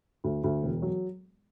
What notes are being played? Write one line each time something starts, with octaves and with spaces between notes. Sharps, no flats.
D2
D2
E1
F#3